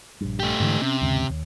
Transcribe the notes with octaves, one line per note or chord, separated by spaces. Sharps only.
A#1 G2
A3 G4
G#2 D3 E3
C3 C#4
D#2 G#2 C#3
D#2